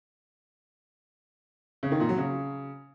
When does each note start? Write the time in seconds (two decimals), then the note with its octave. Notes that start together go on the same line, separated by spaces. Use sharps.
1.83 C#3
1.92 D#3
2.00 A#2
2.09 F#3
2.18 C#3